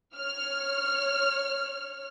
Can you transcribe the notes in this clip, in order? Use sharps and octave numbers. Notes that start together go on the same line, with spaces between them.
C#5 F6